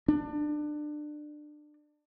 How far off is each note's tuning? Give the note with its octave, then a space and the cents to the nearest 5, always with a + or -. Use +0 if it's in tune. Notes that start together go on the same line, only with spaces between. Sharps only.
D4 +25